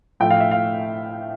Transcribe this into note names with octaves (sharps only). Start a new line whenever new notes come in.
A2 F3 A3 G5
F5
E5
F5